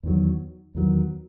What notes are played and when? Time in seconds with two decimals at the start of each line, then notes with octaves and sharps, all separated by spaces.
0.03 E2 D#3 F#3
0.75 E2 D#3 F#3